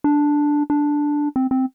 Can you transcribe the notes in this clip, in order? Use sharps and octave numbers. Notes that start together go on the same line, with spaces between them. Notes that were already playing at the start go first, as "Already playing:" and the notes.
D4
D4
C4
C4